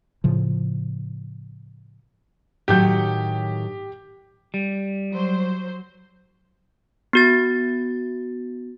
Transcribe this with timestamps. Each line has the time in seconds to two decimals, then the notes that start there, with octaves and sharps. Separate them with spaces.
0.24 A2 C#3 F3
2.68 A2 D#3 F#3 G4 G6
4.54 G3
5.13 F#3 C5
7.13 B3 F#4 A6